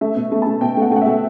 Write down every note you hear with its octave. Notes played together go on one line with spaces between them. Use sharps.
A3 E5
B2
A3
A3 A5
B2 G5
A3 F#5
A3 F#5
A3 E5